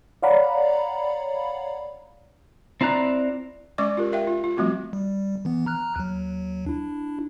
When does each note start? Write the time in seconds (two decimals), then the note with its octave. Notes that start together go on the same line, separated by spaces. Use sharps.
0.23 C#5 D5 F5 F#5 A#5 B5
2.81 C4 E4 D5 A#5 F#6
3.78 G#3 C#4 D5 C#6 D6
3.97 F4 G4 A#4
4.12 A#4 E5 F5 G5
4.27 F4
4.44 F4
4.57 F3 G3 A3 C4 F#4
4.93 G3
5.45 E3 B3
5.66 A#5 F6 F#6
5.96 D#2 F#3
6.66 D4 E4